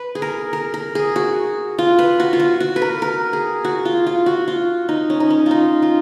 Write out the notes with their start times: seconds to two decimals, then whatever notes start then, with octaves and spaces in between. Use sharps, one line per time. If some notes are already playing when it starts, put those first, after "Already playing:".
Already playing: B4
0.15 G#4
0.22 A#4
0.53 A#4
0.74 A#4
0.95 G#4
1.16 F#4
1.78 F4
1.99 B4
2.20 F#4
2.33 F4
2.40 F#4
2.60 F#4
2.76 B4
2.82 A#4
3.02 A#4
3.33 G#4
3.64 F#4
3.85 F4
4.07 F4
4.26 F#4
4.48 F4
4.89 D#4
5.10 C#4
5.20 D#4
5.30 C#4
5.46 D#4 F4
5.82 F4